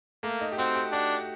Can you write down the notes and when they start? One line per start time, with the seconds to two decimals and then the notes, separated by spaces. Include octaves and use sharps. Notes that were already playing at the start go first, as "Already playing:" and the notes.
0.23 A3 A#3
0.41 D#4
0.52 G4
0.58 C4 F#4
0.76 G4
0.92 D4 F#4